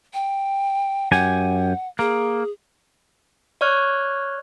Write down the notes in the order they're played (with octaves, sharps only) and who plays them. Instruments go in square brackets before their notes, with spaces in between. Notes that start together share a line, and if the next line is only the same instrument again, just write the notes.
[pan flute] G5
[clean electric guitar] F#2 G4 G#5 [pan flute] F#5
[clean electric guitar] A#3 [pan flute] G#4
[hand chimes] C#5 D5 C#6 F6 F#6 G#6